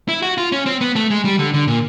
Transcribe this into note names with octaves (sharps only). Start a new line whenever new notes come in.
E4
F#4
F4
C#4
C4
B3
A3
G#3
G3
D3
D3
A#2